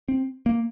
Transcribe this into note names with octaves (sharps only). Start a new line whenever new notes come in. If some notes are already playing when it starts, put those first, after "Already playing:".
C4
A#3